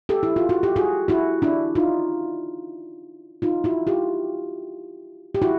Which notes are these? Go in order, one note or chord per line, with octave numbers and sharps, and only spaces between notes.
G4 A4
E4
F4
F#4
G4
F#4 G#4
E4 F#4
D4 E4
D#4 F4
D#4 F4
E4 F#4
F4 G4
G4
E4 F#4